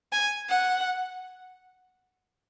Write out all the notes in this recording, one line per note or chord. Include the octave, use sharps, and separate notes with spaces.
G#5
F#5